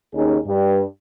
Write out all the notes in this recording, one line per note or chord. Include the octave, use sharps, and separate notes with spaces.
D#2 C#4 D#4 G#4
G2